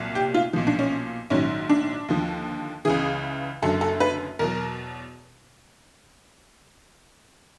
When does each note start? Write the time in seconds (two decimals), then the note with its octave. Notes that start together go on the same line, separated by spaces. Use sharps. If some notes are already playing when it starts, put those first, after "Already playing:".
Already playing: C2 A#2 F#3
0.15 G4
0.34 F4
0.53 B1 A#2 F3
0.67 D4
0.79 C#4
1.30 A#1 G#2 D#3 F#3 C#4
1.69 D4
2.08 D#2 D3 F3
2.85 C#2 C#3 E3 G#4
3.62 F#1 F#2 D3 F#3 A4
3.81 A4
4.00 B4
4.39 E2 B2 F#3 A#4